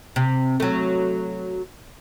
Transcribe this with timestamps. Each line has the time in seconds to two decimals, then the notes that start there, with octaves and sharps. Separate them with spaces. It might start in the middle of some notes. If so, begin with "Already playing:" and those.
0.16 C3
0.60 F#3 A3